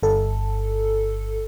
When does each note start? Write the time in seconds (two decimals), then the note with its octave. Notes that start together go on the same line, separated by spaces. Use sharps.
0.03 G1 A4